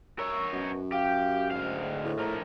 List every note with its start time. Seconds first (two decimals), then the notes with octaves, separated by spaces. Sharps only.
0.19 A#4 C#5 C#6 E6
0.53 F#2 B2 F#4
0.92 G4 F5
1.51 D2 G#2 F5
2.05 A2
2.19 F3 A#4